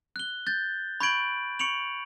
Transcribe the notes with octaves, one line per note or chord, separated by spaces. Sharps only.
F#6 G7
G6 A6
B5 C#6 G6 G#6 D7 F#7
C#6 C#7 D7 F7 F#7